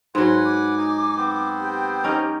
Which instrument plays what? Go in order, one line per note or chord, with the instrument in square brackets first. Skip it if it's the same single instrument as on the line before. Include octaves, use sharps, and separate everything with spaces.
[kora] G#2 F#3 [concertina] B4 F#5 G#5 [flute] C6
[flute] D6
[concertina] D#4 D#5 G#5
B3 C4 C5
[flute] G4
[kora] C#4 D#4 A#4